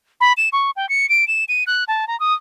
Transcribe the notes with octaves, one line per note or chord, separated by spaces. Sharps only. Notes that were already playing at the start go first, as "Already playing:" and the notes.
B5
E7
C#6
G5
C#7
D7
E7
D#7
F#6
A5
A#5
D#6